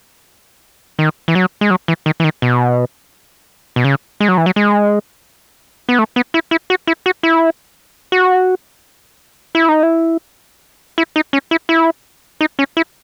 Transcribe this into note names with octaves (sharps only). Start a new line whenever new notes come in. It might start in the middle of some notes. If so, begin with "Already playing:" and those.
D#3
E3
F#3
G#3
F#3
E3
D#3
E3
D#3
B2
B2
C#3
G#3
F#3
E3
F#3
G#3
B3
A3
B3
E4
E4
F#4
E4
F#4
E4
F#4
E4
D#4
E4
E4
D#4
C#4
E4
E4
D#4
C#4
E4